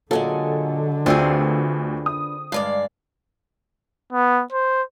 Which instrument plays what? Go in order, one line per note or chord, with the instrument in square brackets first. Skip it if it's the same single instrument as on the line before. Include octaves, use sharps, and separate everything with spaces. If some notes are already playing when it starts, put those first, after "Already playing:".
[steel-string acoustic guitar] A#2 G#5 [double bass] D3 [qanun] F#3 G#3 [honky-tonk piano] A4
[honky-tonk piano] D2 E6 [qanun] C4 F4 G#4 [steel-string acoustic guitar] D4 B4
[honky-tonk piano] D#6
[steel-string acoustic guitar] G2 G#3 D5 [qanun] F5
[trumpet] B3
C5